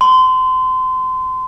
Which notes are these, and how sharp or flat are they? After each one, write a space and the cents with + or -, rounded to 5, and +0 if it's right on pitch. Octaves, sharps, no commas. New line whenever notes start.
C6 -30